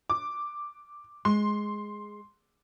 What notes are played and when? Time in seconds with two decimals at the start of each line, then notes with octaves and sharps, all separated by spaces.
0.10 D6
1.25 G#3 C6